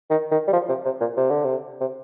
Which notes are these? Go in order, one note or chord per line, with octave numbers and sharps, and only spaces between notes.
D#3
D#3
G3
F3
C3
C3
A#2
C3
D3
C3
C3